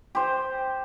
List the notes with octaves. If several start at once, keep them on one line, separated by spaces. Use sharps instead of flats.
G4 C5